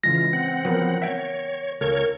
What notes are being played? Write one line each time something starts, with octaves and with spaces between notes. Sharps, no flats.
C#3 E3 G#3 F4 A#6
C4 F#5
F3 F#3 B3 A#4 B4
C#5 E5 F#5 G5
C#2 A4 A#4 C#5 G#6